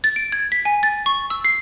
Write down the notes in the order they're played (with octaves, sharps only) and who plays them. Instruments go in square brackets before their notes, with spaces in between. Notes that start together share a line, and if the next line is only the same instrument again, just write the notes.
[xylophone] A6
D7
G#6
B6
G#5
A6
C#6
E6
C7